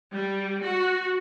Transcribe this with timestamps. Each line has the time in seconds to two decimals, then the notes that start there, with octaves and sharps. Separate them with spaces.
0.12 G3
0.62 F#4